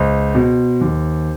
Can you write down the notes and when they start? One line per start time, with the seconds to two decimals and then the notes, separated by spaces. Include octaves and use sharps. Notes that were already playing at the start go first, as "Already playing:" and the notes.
Already playing: C#2 C5
0.35 B2
0.81 D#2